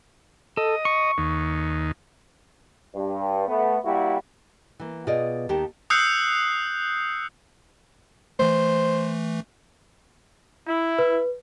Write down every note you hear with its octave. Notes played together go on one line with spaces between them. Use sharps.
A4 D#5
C#6
D#2
G2
A3 B3
G3 A#3 E4 F#4 G4
E3 A#3
B2 F4 G#4 D5 D#5
D#2 D#3 G4 A#4 A5
D#6 E6 F#6 G6 C7 C#7
E3 A3 C5
E4
B4